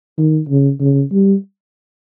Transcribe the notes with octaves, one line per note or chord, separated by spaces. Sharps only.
D#3
C#3
C#3
G3